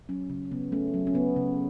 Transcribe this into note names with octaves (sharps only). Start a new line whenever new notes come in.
F#3 C#4
C#3 C#4
C#3 B3
A3 C#4
F#3 C#4
C#4
C#3 B3
C#3